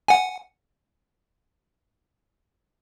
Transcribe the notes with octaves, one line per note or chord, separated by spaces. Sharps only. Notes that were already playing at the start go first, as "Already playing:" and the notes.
F#5 G#5